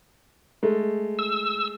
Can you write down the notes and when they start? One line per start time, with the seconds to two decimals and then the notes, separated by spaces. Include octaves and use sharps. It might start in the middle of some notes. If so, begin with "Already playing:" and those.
0.63 G#3 A3
1.19 E6